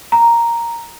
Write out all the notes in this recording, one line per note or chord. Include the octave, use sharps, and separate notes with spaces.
A#5